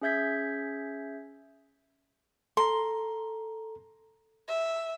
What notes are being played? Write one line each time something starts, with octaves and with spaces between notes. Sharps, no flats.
C#4 G#4 E5 G6 G#6 B6
A4 A#5 C6
E5